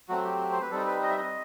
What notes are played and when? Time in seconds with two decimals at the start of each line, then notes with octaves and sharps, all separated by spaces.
0.09 F#3 A3 C4 F#4
0.25 G4
0.52 C5
0.62 B4
0.71 G3 C4 D#4 A4
0.87 B4
1.03 D#5
1.09 E5
1.17 D#5